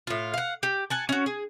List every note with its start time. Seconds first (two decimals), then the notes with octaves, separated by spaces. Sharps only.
0.07 A2 F4
0.34 F5 F#5
0.63 G4
0.90 F#5 G#5 A5
1.09 C#4 F#4
1.26 G#4